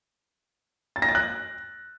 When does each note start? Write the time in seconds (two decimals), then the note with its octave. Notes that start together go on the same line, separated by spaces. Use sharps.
0.96 A6
1.02 A#6
1.09 A6
1.15 F#6